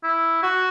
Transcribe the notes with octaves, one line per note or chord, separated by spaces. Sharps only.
E4
F#4